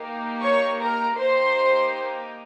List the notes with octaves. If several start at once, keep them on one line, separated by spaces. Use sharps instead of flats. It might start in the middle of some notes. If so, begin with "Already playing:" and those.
Already playing: A#3 D#4 G4
C#5 C#6
A#4 A#5
A#3 D#4 G4 C5 C6